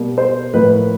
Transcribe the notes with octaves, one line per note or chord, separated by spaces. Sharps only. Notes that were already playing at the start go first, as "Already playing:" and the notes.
Already playing: B2 G3 A#3
C5
A2 F3 A#3 B4